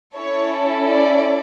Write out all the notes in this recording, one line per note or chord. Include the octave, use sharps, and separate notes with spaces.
C#4 E4 A4 C#5
D5